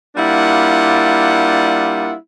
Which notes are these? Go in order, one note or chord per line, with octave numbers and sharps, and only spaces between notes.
G3 A#3 D4 E4 F4 F#5